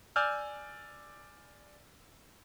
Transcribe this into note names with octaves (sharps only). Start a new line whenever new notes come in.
D5 G#5 E6 F6 G6